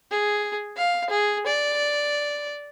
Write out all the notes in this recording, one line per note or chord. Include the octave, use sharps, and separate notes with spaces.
G#4
F5
G#4
D5